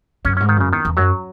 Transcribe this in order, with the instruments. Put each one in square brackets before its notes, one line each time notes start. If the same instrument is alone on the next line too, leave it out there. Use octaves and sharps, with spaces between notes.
[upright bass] F#2 [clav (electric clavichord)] C#4
[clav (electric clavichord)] C#4
[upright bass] G#2
[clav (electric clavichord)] D#3
[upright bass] F#2 [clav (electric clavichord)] C#3
[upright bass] E2 [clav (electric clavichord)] D#3
[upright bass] E2
[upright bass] F#2 [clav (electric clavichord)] F#3